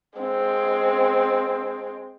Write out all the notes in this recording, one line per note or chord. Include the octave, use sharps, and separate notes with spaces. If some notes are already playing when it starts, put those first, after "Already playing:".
G#3 C4